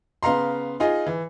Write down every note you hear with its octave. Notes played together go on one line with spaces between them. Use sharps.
C#3 B3 F5 A#5 C6
D#4 F4 G#4 D#5
E3